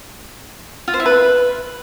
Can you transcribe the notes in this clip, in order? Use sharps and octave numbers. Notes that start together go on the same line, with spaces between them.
F4
C5
E4
B4